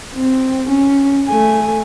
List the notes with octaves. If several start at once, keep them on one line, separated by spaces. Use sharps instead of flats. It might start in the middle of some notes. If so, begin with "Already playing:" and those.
C4
C#4
A3 G#5